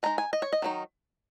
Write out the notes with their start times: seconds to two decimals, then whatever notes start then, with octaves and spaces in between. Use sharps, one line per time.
0.03 G#3 D#4 A#5
0.18 G#5
0.33 D#5
0.42 C#5
0.53 D#5
0.62 D#3 F#3 D#4